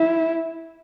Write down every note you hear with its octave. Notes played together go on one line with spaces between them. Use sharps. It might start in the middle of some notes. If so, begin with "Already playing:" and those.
Already playing: E4